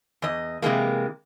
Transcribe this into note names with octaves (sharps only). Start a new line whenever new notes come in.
E2 D#5
C3 E3 G#3 A#3